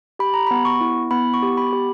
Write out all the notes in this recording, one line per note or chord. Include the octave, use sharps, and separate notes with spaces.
G4 B5
A#5
B5
B3
C#6
E4
B3 B5
C#6
G4
B5
G4